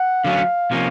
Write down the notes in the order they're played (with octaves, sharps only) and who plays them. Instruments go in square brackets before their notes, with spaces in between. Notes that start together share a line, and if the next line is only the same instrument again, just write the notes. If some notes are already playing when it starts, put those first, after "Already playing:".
Already playing: [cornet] F#5
[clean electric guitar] D3 F#3 A3 C#4 [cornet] F5
[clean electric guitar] C3 F3 A#3 C#4